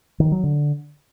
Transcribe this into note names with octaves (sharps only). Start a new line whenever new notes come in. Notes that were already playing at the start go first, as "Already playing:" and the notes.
D#3
F#3
D3